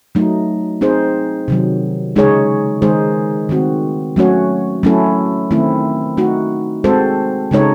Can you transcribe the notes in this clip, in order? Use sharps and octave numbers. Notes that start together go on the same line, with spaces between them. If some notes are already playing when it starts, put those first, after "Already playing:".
F#3 A3 D#4
C4 D#4 G#4 C5
C3 D#3 F#3
C#3 G#3 D#4 G#4 C#5
D#3 G#3 D#4 G#4 C5
D#3 A3 C4 F#4
F#3 A3 C#4 F#4 C#5
F#3 A3 C#4 E4 A4
D#3 A3 C4 E4
A3 D#4 F#4
G#3 C4 F#4 A4 C5
C#3 G#3 D#4 A4 C#5